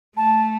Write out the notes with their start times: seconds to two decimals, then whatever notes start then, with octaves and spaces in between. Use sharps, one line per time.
0.17 A3 A5